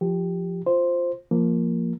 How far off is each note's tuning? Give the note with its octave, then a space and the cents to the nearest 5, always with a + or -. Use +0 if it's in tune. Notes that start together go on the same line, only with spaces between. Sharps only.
F3 +0 G4 +0
F4 +0 C5 +0
F3 -5 A#3 +0